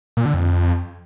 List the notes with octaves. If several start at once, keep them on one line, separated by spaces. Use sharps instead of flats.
A#2
D3
F2